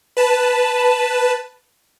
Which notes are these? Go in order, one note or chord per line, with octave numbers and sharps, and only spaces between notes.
B4 A5